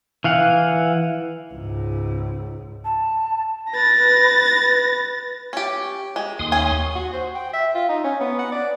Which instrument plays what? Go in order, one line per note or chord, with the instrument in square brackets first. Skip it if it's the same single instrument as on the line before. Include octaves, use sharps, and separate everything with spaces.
[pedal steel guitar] E3 F5 F#5
[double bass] C#2 G#2
[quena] A5
[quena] B4 [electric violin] A6 A#6
[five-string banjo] C#4 G4
G#3
[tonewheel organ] D#2 C6 D#6
[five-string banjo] C#4 G#5
[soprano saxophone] F#4
C5
G5
E5
F4
D#4
C#4
B3
F#5
D5